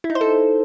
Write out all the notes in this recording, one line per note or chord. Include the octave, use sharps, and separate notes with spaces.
E4
D#4
C5
A4